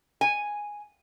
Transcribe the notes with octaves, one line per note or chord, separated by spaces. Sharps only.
G#5